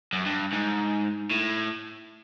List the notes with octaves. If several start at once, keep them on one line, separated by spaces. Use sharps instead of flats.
F#2
G2
G#2
A2